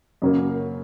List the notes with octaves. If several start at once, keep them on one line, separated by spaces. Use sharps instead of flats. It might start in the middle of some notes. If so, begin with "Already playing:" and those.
F#2 C#3 F#3 A#3